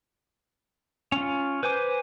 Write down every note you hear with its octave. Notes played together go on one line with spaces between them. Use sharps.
C#4 F4
B4 C5 G#5 D6